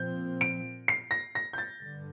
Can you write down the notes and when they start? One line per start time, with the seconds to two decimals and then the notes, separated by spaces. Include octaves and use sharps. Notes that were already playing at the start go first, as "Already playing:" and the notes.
Already playing: A#2 F3 C4 G6
0.41 D7
0.88 C7
1.11 A#6
1.35 A#6
1.53 G6
1.58 A6
1.81 G2 D3